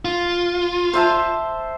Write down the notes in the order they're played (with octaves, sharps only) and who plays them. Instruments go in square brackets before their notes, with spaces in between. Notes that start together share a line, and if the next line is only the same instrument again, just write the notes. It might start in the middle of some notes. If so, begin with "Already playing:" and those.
[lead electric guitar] F4
[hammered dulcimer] C5 E5 A5